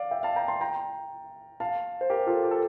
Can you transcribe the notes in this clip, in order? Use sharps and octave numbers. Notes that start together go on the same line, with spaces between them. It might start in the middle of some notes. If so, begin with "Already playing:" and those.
Already playing: D5 F5
E5 G5
F5 A5
G5 A#5
A5 C6
G5 A#5
F5 A5
C5
G4 A#4
F4 A4
G4
A4